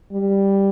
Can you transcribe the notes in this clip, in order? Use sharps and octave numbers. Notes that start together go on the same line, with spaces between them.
G3